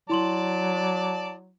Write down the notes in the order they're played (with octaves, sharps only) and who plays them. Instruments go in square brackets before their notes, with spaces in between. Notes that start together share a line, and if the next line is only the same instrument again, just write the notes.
[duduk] F#3 [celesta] E4 C6 F#7 [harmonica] D5 A5